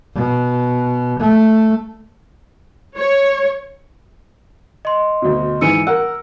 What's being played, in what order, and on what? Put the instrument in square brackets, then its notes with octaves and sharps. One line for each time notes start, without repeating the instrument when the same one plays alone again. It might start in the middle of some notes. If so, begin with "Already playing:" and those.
[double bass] B2
A3
[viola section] C#5
[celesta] D#5 C6
[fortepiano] D2 B2
[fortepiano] G#2 E3 [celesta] E6 C#7 D#7
[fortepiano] A#4 F#5 [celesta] E6